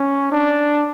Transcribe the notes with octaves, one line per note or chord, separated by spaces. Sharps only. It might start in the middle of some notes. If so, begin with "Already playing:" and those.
Already playing: C#4
D4